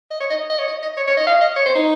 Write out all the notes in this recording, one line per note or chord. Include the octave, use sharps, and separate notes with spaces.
D#5
C#5
D#5
D#5
C#5
D#5
D#5
C#5
C#5
D#5
F5
D#5
C#5
C5
D#4